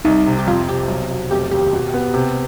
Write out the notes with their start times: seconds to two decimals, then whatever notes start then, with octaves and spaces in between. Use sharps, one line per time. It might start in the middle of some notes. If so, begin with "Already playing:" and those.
0.05 C2 D#4
0.26 C3
0.38 G4
0.47 F2 F4
0.68 C3 G4
0.88 B1
1.10 B2
1.31 F1 G4
1.51 D#2 G4
1.73 B2
1.94 B3
2.14 C3